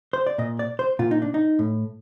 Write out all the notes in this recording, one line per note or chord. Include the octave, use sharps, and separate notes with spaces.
C5
D5
A#2 D#5
D5
C5
A#2 F4
D#4
D4
D#4
A2